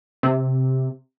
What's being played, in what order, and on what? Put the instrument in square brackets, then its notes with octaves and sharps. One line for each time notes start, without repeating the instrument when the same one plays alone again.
[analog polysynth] C3